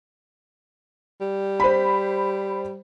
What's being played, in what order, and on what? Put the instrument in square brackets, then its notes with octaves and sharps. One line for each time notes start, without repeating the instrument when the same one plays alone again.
[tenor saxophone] G3
[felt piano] C5 B5